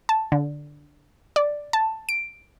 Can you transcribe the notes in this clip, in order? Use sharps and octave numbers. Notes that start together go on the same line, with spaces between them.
A5
D3
D5
A5
D7